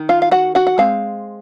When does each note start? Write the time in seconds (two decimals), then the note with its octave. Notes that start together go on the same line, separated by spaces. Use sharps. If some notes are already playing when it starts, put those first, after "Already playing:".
Already playing: D#3
0.09 F4 F5
0.22 F5
0.31 F#4 F#5
0.55 F#4 F#5
0.67 F#5
0.78 G#3 C4 F5